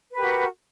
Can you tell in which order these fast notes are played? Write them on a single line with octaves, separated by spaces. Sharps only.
B4 G4 A#4 F#4